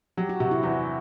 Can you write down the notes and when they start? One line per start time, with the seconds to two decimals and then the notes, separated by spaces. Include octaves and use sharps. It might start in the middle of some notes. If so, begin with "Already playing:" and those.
0.17 F#3 G4
0.29 F#4
0.40 C3 F#4
0.51 E4
0.63 E2 E4